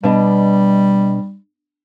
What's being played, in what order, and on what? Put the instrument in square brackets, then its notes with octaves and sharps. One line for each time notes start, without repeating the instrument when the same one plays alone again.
[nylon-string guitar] B2 D4 D#5 [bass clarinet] G3